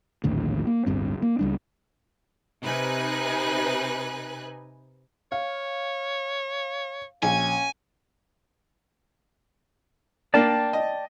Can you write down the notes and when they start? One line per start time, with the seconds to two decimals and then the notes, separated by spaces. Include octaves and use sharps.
0.24 A#1 D#2 A2 D3
0.67 A#3
0.86 D1 G1 G2 C4
1.22 A#3
1.39 C#2 G3 D4
2.62 C3 D#4 B4 G#5 F#6
5.32 C#5 F5
7.23 A#1 C#4 G#5
10.34 A#3 D4 D5 G5 A5
10.73 D#5